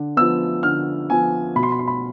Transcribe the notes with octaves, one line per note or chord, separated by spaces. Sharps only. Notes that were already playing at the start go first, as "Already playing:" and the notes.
Already playing: D3
F3 B3 E6
D3 F6
F3 B3 G#5
B2 B5
C6
B5
C6
B5